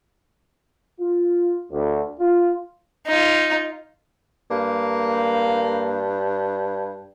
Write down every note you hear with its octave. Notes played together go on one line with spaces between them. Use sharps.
F4
D2
F4
D#4 F4
G2 A#3